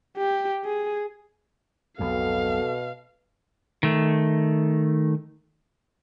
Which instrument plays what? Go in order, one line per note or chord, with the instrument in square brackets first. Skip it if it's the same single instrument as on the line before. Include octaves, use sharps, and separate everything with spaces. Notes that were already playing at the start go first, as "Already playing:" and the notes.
[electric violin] G4
G#4
[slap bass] B1 F2 G#2 [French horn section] B2 [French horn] A4 [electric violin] F5
[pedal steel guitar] D#3 A3